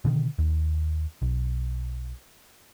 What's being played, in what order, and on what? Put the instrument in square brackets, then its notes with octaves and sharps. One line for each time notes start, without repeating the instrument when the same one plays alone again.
[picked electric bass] B2 D3 D#3
D#2
B1